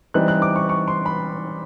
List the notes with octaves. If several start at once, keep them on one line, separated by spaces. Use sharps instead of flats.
E3 G3 C4 D#4 F#6
F#6
D6
C#6
C#6
C6
B5